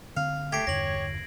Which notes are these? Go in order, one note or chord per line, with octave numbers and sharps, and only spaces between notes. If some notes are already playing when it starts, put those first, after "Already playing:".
D3 C4 F5
A3 G4 G#6 C7 D7
E2 G2 D3 C#5 A#6 F#7